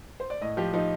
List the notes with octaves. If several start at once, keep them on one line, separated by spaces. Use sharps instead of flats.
C5
D5
A2 D#5
F3 G4
F3 D#4